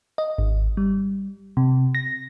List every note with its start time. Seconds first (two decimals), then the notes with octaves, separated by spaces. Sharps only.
0.18 D#5
0.38 G#1
0.77 G3
1.57 C3
1.95 A#6